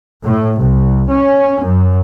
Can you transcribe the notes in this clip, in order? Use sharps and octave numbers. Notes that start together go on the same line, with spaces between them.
A2
C2
C#4
F#2